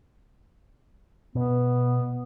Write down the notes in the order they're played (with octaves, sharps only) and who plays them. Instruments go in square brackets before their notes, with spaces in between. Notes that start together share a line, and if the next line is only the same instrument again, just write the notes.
[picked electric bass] B2 [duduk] B3